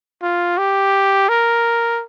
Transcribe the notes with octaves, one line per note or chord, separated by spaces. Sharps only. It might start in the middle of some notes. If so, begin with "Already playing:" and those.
F4
G4
A#4